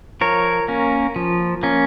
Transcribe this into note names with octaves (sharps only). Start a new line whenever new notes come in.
F3 A#4 C#5
A#3 C#4
F3
A#3 C#4